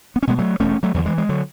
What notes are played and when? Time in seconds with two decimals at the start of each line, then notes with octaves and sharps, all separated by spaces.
0.16 B3
0.23 C#4
0.27 B2 G#3 B3
0.38 F#3 A3
0.60 E1 A3 C#4
0.83 F#3 A3
0.94 E2 D3 F#3
1.06 E3 G#3
1.18 G#3
1.29 D3 F#3